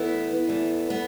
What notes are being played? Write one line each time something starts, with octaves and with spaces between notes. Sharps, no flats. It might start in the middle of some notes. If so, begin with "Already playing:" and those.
Already playing: E2 E3 A3 B3 E4
E2 E3 A3
B3